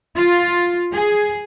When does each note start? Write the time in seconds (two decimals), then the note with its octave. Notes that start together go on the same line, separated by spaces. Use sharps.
0.15 F4
0.92 G#4